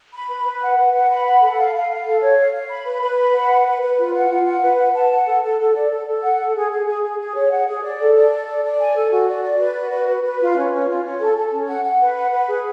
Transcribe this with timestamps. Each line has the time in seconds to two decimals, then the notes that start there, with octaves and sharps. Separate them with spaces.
0.13 B5
0.29 B4
0.45 B4
0.61 F#5
0.77 B4
0.93 F#5
1.10 B5
1.25 F#5
1.41 A4
1.57 F5
1.74 F5
1.90 F5
2.05 A4
2.22 C#5
2.37 F5
2.53 F5
2.70 B5
2.86 B4
3.02 B4
3.18 B5
3.34 F#5
3.50 B4
3.66 B4
3.82 B4
3.98 F4
4.14 F#5
4.30 F4
4.46 F#5
4.62 B4
4.79 F#5
4.95 A5
5.11 F#5
5.27 A4
5.43 A4
5.59 A4
5.75 D5
5.90 A4
6.07 A4
6.23 F#5
6.39 A4
6.55 G#4
6.70 G#4
6.86 G#4
7.03 G#4
7.19 G#4
7.35 C#5
7.51 F#5
7.67 G#4
7.83 D5
7.99 A4
8.15 D5
8.31 A4
8.47 D5
8.63 D5
8.80 G#5
8.95 A4
9.11 F#4
9.28 D5
9.43 D5
9.60 B4
9.76 F#4
9.91 B4
10.08 B4
10.24 B4
10.40 F4
10.56 C#4
10.72 C#4
10.88 F4
11.03 C#4
11.20 A4
11.36 A4
11.52 C#4
11.68 F#5
11.84 F#5
12.00 B4
12.16 F#5
12.32 B4
12.48 G#4